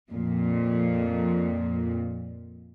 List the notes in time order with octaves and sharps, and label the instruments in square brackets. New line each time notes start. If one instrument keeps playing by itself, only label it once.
[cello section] F2 A#2